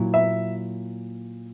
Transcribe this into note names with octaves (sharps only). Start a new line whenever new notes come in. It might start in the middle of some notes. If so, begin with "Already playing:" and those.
Already playing: A#2 F#3 E4
E5